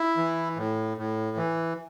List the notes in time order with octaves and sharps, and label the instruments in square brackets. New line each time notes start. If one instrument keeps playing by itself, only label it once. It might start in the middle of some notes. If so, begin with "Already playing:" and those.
Already playing: [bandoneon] E4
E3
A2
A2
E3